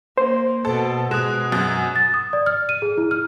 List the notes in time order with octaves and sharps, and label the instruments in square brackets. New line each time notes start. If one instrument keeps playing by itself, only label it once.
[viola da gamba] A#3 [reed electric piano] C5
[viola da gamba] B2 [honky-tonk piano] A4
[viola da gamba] B2 [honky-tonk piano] G#3 [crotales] D#6 F#6 E7
[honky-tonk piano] F#2
[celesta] A6
D#6
D5
F6
D#7
G#4
E4
F6